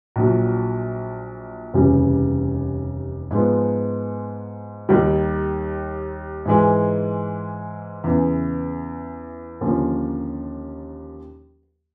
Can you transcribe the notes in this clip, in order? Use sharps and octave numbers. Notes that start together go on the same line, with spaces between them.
A#1 A#2 F#3
F1 D#2 C#3 E3 G3
G#2 F3 G#3 B3
D#2 D#3 G3
G#2 E3 G#3
E2 C#3 E3
D#2 D3 F3 A#3 C#4